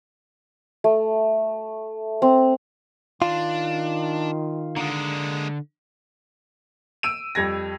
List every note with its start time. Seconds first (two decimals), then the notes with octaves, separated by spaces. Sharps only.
0.84 A3
2.22 C4
3.22 D#3 D4 F4
4.76 D3 G#3 A#3
7.03 E6 D7 D#7
7.35 F2 G3 G#6 A#6